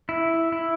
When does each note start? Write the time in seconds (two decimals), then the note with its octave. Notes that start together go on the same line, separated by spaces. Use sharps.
0.09 E4
0.52 E4